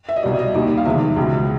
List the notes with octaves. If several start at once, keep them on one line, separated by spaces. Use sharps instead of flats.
E5
D#5
C2 B2 G3 D5
D#5
D#2 D#3 G3
F5
E2 C3 D#3 G#3 E5
C#2 B2 G#3